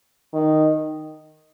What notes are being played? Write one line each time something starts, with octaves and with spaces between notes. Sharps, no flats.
D#3